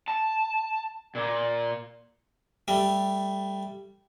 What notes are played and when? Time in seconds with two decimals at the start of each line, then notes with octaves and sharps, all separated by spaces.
0.08 A5
1.15 A#2
2.68 G3 A3